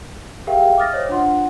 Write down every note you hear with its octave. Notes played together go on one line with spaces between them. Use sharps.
G4 G#4 A#4 E5 F5 G5
D6 D#6 F6 A6 A#6
C5 C#5 D#5
D4 F4 F#5 C6